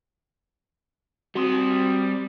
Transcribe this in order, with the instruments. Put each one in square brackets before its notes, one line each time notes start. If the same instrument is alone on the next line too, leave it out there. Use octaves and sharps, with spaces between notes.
[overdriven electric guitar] G3 C6 [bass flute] C4 [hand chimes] F#4 D#6